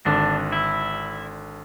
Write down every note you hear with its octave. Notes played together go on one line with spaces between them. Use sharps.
G#1 D3 D4
E4